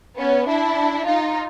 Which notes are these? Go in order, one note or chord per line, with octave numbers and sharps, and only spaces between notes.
B3 C#4
D4 E4
D#4 F4